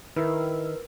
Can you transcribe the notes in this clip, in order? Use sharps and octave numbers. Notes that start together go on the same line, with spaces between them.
D#3 E4 A#4 B4